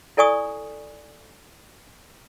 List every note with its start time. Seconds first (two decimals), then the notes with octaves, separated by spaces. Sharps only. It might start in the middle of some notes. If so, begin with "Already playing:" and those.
0.17 E4 A4 D5 G#5 C#6 D#6